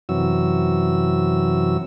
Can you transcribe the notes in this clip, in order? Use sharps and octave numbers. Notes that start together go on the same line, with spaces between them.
F#2 C3 E3 F#3 F#4 E6